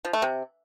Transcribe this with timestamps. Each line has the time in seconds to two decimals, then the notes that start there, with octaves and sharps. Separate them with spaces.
0.05 F3
0.13 A3
0.22 C3